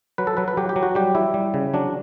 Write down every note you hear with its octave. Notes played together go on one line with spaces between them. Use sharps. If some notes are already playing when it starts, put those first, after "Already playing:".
F#3 B4
A4
F#3 B4
B4
F#3 G4
G4
F#3
F#4
G3 G4
G3 E4
G3
C#3
F#3 D4